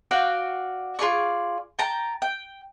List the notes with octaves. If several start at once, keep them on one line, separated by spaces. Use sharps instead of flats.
F#4 D5 F5 G5
F4 G#4 D5 C#6
G5 A5 A#5
G5